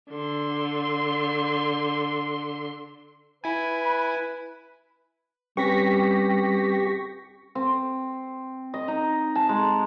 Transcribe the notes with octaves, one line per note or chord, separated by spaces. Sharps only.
D3 C6
E4 B4 G#5 B5
G3 C4 C#4 G4 B4 C#6 A#6 B6
C4
D#5
D#4
A5
G#3